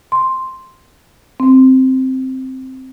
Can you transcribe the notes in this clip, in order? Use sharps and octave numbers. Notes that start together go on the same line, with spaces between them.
C6
C4